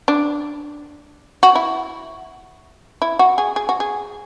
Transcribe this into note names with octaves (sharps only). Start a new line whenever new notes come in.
D4
F#4
E4
E4
F#4
G#4
G#4
F#4
G#4